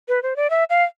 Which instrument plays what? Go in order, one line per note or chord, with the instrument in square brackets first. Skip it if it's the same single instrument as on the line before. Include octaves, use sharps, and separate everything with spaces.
[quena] B4
C5
D5
E5
F5